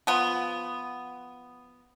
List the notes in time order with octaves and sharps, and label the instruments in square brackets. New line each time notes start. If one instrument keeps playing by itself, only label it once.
[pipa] F3 B3